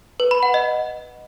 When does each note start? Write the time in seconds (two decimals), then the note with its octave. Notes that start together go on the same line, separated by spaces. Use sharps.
0.20 B4
0.31 B5
0.43 F#5
0.54 D#5